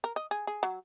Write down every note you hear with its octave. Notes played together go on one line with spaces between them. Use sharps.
A#4
D#5
G#4
G#4
F#3